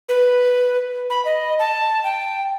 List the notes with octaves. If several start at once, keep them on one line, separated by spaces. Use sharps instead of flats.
B4
B5
D#5
A5
G5